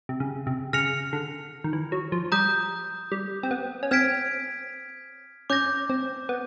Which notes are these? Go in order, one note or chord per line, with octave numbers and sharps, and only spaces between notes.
C3
C#3
C3
C#3 F6 A#6 C#7 F7
D3
D#3
E3
F#3
F3
G3 A#5 D#6 G6
G3
C4
B3
C#4
C4 F6 G#6 B6 D7
C#4 D6 G6 A#6
C4
B3